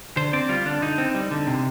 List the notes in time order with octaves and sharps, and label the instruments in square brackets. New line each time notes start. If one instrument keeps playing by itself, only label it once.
[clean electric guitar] D3 C5
C4 D5
G3 F4
D3 D4
D3 D#4
C4
G3
D3
C3